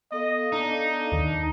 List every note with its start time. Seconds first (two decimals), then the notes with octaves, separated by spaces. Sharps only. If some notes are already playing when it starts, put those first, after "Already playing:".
0.12 B3 A4 D#5 F5
0.52 D4 D#4
1.12 D#2 D#3